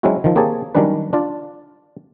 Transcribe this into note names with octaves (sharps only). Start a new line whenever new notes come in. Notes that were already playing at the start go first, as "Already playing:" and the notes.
F#3 G#3 C4 C#4 E4 F#4
D#3 F3
A#3 C4 G4 G#4 C#5 A5
D#3 F#3 G3 C#4 D4 B4
D4 F4 D5